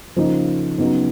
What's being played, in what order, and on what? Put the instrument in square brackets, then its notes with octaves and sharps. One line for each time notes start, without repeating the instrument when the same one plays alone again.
[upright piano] C#3 F3 A#3 D#4
C#3 F#3 B3 D#4